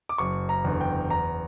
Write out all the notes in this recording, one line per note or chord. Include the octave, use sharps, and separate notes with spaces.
D6
F#1 C#6
A#5
E2 D3
G5
E2 A#5